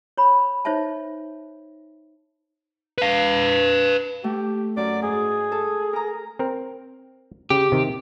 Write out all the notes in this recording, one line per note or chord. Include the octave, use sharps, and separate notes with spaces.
C#5 B5
D#4 C5 C#5 E5 A5
B4 F5
A3 G4
F#2 D5
G#2 G#4
A4 A5
A#4 A#5
C4 A#4
C#3 G4
C3 D#3